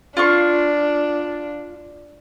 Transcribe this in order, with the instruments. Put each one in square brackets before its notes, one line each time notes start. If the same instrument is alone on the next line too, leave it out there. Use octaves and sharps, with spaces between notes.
[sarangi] D4 [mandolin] F4 C6 C#6